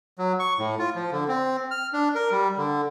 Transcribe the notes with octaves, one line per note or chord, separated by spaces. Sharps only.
F#3
C#6
A2
F4
F3
D3
C4
F6
D4
A#4
G3
D3